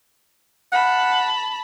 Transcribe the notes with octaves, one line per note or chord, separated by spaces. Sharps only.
F#5 A5 B5